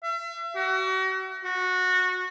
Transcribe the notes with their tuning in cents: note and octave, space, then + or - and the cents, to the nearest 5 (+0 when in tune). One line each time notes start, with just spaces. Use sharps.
E5 +40
F#4 +35
F#4 -15